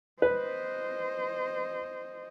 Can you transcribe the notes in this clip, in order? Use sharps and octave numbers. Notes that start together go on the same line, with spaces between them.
B4 C5 D#5